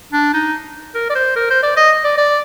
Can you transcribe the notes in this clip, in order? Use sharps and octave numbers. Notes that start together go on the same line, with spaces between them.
D4
D#4
A#4
D5
C5
A#4
C5
D5
D#5
D5
D5